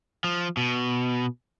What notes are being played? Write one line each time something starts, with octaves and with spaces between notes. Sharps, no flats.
F3
B2